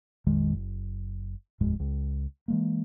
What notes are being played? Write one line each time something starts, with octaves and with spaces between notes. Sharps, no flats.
A#1 F2 D#3 G#3
F#1
F1 D#2 A2 G#3
C#2
E3 G#3 A#3